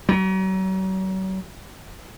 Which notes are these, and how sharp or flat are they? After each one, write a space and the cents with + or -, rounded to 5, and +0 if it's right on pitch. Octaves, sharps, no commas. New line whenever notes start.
F#3 +40